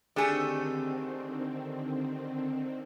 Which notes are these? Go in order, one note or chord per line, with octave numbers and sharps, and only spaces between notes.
D3 D#3 A3 C4 D4 G4 G#4